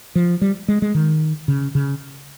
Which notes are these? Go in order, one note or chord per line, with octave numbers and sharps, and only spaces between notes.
F3
G3
G#3
G#3
D#3
C#3
C#3